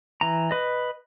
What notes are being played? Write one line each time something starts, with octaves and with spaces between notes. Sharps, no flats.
E3 A#5
B4 D#5